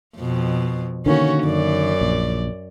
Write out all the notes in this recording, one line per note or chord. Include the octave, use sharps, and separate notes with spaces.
F2 B2
D3 D#3 A#3 C#4 F#4
F#2 D5
A#1